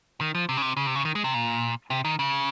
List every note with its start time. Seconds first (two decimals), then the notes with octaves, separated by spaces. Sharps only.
0.21 D#3
0.35 F3
0.49 C3
0.57 C#3
0.62 C3
0.77 C#3
0.87 C3
0.95 C#3
1.05 D#3
1.15 G#3
1.24 C3
1.34 A#2
1.90 C3
2.05 D#3
2.19 C#3